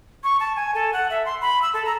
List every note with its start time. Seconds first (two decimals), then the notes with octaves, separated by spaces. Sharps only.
0.24 C#6
0.40 A5
0.56 G#5
0.75 A4
0.93 F#5
1.10 E5
1.25 C6
1.41 B5
1.62 E6
1.74 A4
1.85 A#5